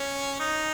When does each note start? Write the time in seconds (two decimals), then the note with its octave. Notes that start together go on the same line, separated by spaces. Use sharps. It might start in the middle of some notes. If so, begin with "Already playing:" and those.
Already playing: C#4
0.40 D#4